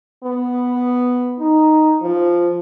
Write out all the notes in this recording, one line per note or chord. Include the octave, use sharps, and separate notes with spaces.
B3
D#4
F3